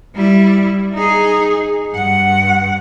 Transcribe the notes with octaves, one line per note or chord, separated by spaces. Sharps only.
G3 E4
D#4 G#4
G2 F#5